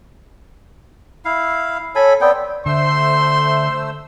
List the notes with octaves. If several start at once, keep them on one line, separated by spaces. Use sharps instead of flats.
E4 F5
A4 C#5 G#5 B5
B3 C4 D5 G5
D3 A3 C5 C6 E6